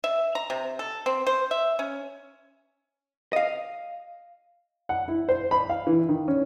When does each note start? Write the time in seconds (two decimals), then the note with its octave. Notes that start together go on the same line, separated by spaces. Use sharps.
0.04 E5
0.35 A#5
0.50 C3
0.79 A4
1.06 C4
1.27 C5
1.51 E5
1.79 C#4
3.33 D#5 F5
4.89 F#5
5.08 E4
5.29 C5
5.51 B5
5.70 F5
5.87 E3
6.09 D#3
6.28 C#4